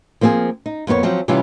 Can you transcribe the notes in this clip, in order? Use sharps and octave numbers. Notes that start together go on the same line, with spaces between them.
F3 A#3 C4 E4 G#4
D#4
F2 A#3 B3 F#4 C#5
F3 F#3 C4
C3 E3 G3 C#4 E4 F4